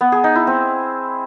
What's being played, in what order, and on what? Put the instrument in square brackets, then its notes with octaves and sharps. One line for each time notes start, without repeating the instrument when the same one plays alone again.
[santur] B3
G#4
D#4
E4
C4